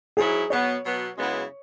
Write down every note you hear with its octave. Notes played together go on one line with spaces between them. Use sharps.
G#2 F#3 E4 G#4
B2 F#3 B3 C#5
B2 F#3 B3
F#2 C#3 G#3 B3 E4